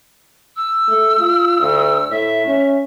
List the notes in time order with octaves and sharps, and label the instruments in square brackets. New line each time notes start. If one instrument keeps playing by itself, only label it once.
[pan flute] E6
[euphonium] A3
F4
D2
[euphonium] A2 [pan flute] E5
[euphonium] C#4